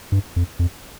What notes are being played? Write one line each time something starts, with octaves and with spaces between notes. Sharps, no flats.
G2
F2
F2